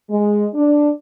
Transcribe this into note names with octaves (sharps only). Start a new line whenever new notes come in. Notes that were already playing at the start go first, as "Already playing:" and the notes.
G#3
D4